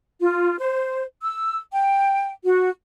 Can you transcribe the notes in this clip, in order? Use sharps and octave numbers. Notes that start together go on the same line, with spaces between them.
F4
C5
E6
G5
F#4